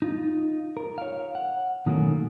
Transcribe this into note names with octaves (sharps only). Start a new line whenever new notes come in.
D#4 F4
A#4
C#5 F5
F#5
B2 D#3 F#3 A3 A#3 C#4